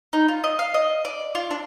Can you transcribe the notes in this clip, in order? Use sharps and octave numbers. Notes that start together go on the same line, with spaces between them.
D#4
F4
D#5
F5
D#5
D5
F4
D4